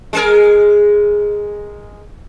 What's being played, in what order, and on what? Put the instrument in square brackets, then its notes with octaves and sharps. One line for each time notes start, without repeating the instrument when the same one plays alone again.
[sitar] G#3 G#4 A#4